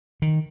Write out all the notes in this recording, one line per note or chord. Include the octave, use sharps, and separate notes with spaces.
D#3